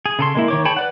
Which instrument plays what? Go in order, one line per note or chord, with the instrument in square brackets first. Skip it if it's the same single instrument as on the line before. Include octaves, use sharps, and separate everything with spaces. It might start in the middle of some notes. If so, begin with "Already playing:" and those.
[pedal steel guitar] G#4
C#3 A4 C6
G#3 A#3 E4
D#3 C#5 D6
G#4 C#5 G5 A5 B5
B4 D5 F#5